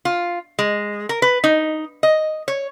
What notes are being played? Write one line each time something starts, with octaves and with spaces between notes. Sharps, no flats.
F4
G#3
A#4
B4
D#4
D#5
C#5